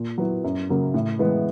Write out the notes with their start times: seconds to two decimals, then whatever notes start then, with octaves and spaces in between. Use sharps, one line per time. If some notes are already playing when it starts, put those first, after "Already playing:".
Already playing: A#2
0.18 F#3 B3 E4
0.44 F#2
0.69 C#3 F#3 A#3 C#4
0.94 A2
1.19 E3 G#3 B3